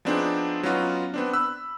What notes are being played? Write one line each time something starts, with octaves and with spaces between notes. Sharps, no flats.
F3 B3 C4 D4 D#4 G#4
F#3 B3 C#4 D#4 F4 F#4
B3 C4 D4
B5 E6 F#6